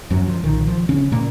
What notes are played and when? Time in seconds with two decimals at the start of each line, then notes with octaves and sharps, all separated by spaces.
0.10 F#2 F#3
0.27 F3
0.44 B1 A#2 D#3
0.67 F3
0.89 C#3 C#4
1.12 A#2 C#3 A#3